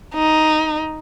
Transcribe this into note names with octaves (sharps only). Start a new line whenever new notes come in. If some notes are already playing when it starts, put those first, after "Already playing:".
D#4